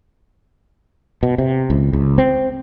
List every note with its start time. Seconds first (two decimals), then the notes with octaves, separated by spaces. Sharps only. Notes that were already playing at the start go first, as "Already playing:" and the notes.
1.23 B2
1.38 C3
1.70 C#2
1.93 C#2
2.18 C4